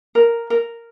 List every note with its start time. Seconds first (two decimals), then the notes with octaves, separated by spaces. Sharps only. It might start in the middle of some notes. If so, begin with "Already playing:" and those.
0.15 A#4
0.50 A#4